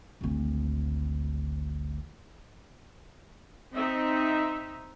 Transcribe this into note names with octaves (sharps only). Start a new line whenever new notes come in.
G#1 D2
C4 D#4 E5